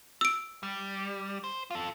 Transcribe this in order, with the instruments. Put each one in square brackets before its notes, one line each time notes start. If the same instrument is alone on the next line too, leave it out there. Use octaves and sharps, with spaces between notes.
[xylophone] E6 D7
[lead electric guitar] G3
C5
F4 A4